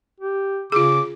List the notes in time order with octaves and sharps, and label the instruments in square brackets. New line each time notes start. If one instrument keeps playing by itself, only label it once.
[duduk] G4
[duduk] C#3 [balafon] F4 G#4 [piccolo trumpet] D6